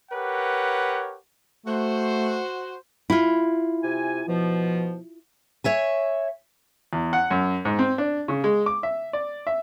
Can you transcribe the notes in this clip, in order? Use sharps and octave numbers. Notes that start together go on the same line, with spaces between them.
G4 A#4 B4 C#5 F#5
A3 F#4 C5
E4 F4
C3 G#5
B2 F3
C#5 E5 G#5
E2
F#5
F#2
G#2
C4
D4
C#3
G#3
D6
E5
D5
E5